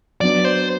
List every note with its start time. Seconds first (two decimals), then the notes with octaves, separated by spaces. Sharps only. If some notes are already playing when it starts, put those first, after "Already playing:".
0.21 F#3 B3 D4 D5
0.45 C5